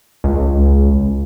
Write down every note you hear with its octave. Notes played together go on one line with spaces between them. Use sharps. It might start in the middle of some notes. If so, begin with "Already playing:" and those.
C#2